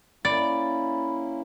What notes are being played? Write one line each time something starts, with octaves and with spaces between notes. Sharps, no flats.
A#3 C#4 E4 D5 B5 A6